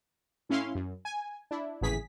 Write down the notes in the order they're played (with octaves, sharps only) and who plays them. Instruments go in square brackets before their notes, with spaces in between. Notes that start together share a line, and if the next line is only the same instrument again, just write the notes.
[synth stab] A2 C#4 E4 F5 C6
F#2
G#5
D4 E4
G#1 A2 C#3 E3 G#4 B6